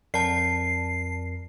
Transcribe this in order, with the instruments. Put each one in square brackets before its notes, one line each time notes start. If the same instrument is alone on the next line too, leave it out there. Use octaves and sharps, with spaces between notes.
[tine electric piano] F2 A#4 [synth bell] D5 A5 [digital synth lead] C7